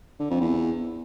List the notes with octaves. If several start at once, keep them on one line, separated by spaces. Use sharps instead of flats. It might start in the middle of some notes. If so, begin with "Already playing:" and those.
D3
F2
E2